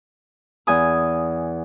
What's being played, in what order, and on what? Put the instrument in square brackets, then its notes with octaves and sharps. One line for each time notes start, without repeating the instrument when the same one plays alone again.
[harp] E2 G#5 D#6